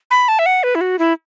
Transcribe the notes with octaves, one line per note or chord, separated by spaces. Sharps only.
B5
A5
E5
F#5
B4
E4
F#4
E4